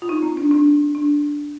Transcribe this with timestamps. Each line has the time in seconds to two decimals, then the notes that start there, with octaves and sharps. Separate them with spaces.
0.02 F4
0.09 D#4
0.23 C4
0.37 D4
0.51 D4
0.95 D4